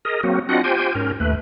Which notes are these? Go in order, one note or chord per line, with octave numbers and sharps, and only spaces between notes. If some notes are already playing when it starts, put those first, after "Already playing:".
G#4 A#4 D#5
F#3 A#3 C4 F#4
C4 D4 F4 F#4 D#5 F#5
F4 G4 C5 G5 G#5
G#2 C#4 A#4
D#2 A3 B4